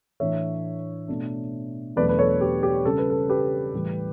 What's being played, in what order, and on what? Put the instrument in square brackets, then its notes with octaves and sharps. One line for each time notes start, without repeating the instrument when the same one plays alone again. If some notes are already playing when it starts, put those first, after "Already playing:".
[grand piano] A2 E3 A3 D4 C#5 E5
B2 A3 D4
E2 B2 F#3 A3 D4 B4 D5
B4
A4 C#5
G4 B4
G4
C#3 G3 C#4 A4
B4
A4
G4 B4
A2 E3 G3